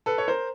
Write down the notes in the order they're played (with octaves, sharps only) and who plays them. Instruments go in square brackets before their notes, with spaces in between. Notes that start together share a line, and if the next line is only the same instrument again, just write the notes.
[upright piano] A4 B4
C#5
A#4 C5